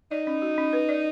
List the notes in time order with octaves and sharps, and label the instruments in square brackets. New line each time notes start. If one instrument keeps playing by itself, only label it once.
[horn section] D#4 [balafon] D5
[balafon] C#4
F#4
C#4
B4
D5